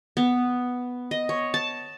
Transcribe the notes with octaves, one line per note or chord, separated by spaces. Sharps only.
B3
D#5
C#5
A5